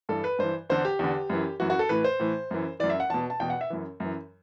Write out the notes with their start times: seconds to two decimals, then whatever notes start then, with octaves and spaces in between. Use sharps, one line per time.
0.09 G2 E3 A4
0.24 B4
0.39 G2 E3 C5
0.70 E2 D3 C5
0.85 G4
0.99 E2 D3
1.30 F#2 E3
1.60 F#2 E3 F#4
1.70 F#4
1.79 A4
1.89 A2 E3 B4
2.04 C5
2.20 A2 E3
2.51 F#2 E3
2.80 F#2 E3 D5
2.90 E5
3.00 F#5
3.10 E2 B2 A5
3.30 A5
3.40 E2 B2 G5
3.50 F#5
3.61 E5
3.70 F#2 E3
4.00 F#2 E3